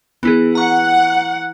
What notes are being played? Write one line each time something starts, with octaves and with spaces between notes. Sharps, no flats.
E3 B3 E4 G#4
F#5 A#5 C#6